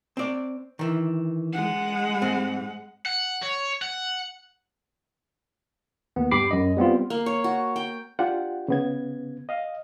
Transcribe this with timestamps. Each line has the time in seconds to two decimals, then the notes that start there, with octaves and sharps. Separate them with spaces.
0.17 C4 D5
0.79 D#3 E3
1.53 G#3 F#5
2.21 G#2 C4
3.06 F#5
3.42 C#5
3.82 F#5
6.16 D#2 B3
6.31 G2 G4 B5 D6 C7
6.51 F#2 D#5
6.77 G3 B3 C4 F4
7.10 A#3
7.26 C#5
7.44 F#4
7.76 G5
8.19 D4 F4 G4 F#5 G5
8.68 C#3 B3 G#6
9.49 D#5 F5